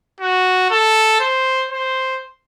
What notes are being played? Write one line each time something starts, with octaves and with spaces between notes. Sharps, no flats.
F#4
A4
C5
C5